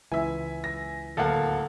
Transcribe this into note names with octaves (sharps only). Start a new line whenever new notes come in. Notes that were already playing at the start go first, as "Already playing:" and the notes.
C#2 E3 E5 G#5
A#6
D1 A#3 A4 F5 F#5